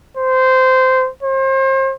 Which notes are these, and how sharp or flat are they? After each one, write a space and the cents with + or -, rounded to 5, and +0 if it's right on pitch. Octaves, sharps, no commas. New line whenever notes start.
C5 -15
C5 +35